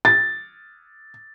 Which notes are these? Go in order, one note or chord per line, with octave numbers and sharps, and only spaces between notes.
A6